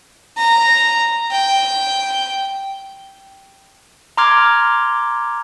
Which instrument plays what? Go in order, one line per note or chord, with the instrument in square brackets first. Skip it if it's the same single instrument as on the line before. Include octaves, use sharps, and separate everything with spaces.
[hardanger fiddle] A#5
G5
[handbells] A#5 C6 D6 F6 G#6